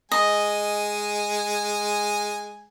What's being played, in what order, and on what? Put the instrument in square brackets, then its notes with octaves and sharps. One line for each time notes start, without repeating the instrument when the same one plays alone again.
[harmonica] G#3 G#5 [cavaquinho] D#5